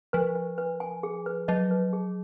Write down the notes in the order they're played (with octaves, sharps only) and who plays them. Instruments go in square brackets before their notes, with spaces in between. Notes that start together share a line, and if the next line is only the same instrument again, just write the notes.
[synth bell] F3 [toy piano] B4
[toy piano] B4
B4
G#5
G#4
B4
[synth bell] F#3 [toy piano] D#5
[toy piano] B4
G#4